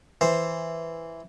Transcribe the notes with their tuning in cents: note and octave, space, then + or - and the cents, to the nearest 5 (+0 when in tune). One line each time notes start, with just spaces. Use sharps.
E3 +0 C5 +0